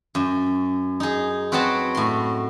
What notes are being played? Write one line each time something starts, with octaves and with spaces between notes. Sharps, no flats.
F#2
D#4 G#4
C4 F#4 B4 C#5 D#5 A5
A2 C6